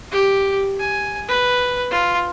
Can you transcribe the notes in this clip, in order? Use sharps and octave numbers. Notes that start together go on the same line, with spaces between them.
G4
G#5
B4
F4